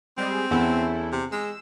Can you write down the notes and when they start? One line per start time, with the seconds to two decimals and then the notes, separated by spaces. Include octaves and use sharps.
0.18 G3 G#3 C4 G#4
0.51 E2 C#4 E4 A4
1.12 C3
1.32 G#3 E6